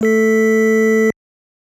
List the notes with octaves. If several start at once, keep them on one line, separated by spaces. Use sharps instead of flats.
A3 A4 B6